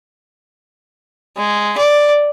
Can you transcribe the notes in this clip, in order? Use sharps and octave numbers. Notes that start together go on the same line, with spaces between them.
G#3
D5